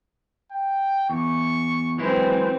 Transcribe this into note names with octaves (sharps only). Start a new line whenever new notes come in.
G5
E2 C#6
E3 F#3 G#3 C4 E4